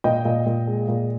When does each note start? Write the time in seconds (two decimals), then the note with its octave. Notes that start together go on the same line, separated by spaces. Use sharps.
0.04 A#2 D#5 G5
0.25 A#2
0.46 A#2
0.67 G#3
0.88 A#2